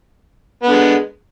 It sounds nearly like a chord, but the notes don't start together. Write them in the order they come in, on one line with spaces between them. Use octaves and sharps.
B3 D3 G#3